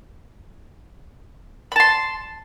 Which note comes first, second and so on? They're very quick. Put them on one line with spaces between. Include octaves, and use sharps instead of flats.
B5 A5 C6